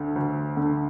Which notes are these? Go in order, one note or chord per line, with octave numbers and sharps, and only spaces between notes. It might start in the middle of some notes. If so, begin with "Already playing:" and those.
Already playing: D2 D3
D2
D3